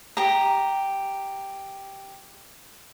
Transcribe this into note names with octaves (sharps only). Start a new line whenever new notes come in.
G4 A#5